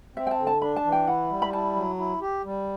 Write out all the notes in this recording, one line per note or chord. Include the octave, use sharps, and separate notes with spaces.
C4 E5
G5
A5
D3
A5
D4 B5
A5
E3
G5
E4 F#5
G3
B5
E4 A5
F#3
E4
G4
G3